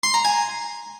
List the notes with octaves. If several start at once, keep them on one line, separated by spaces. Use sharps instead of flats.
C6
A#5
G#5